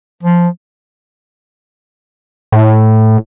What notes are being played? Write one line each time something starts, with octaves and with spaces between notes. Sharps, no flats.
F3
A2